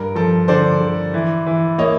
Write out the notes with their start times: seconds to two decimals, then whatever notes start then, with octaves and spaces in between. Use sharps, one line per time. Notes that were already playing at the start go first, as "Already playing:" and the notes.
Already playing: G2 A#4
0.15 F3 A4
0.48 D3 C5 D5
0.81 D3
1.14 E3
1.46 E3
1.78 A#3 C#5 D#5